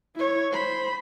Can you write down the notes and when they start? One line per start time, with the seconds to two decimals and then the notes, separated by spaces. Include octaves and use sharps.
0.16 E4 C#5
0.51 C5 B5